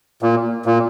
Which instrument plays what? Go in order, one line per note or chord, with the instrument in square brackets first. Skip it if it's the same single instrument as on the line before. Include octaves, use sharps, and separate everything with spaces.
[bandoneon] A#2
A#2